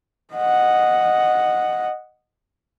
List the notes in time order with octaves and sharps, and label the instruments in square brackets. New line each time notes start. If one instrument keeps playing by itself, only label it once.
[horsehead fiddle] D#5 F#5